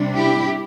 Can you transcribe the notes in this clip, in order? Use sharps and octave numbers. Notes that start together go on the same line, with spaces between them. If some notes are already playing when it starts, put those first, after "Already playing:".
Already playing: C3 G3 D4
E4 G4